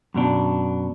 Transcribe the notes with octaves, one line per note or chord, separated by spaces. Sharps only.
F#2 B2 D4